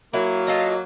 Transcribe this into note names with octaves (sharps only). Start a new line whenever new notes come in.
F#3 A#3 E4
F4 A4 D#5